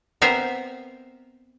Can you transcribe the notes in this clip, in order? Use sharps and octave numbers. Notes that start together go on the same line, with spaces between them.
B3 C4 A#4 C5 E5